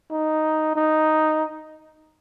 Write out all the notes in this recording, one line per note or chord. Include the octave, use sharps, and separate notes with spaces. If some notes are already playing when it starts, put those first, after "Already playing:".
D#4
D#4